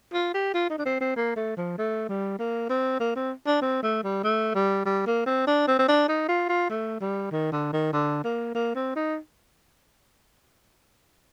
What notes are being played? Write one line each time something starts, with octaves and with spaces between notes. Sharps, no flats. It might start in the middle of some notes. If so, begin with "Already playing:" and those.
F4
G4
F4
D#4
D4
C4
C4
A#3
A3
F3
A3
G3
A#3
C4
A#3
C4
D4
C4
A3
G3
A3
G3
G3
A#3
C4
D4
C4
C4
D4
D#4
F4
F4
A3
G3
D#3
D3
D#3
D3
A#3
A#3
C4
D#4